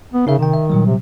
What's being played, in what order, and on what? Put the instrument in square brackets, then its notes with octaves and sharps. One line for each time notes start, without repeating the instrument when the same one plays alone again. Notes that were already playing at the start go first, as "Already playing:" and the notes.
[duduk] B3
[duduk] C#3 [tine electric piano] D#4 A#4 E5
[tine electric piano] C3 G5 [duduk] D#3
[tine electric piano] E5
A#2 F#3 G3
[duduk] C3